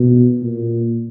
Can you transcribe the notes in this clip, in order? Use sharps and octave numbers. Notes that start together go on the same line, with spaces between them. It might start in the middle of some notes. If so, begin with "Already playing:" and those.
Already playing: B2
A#2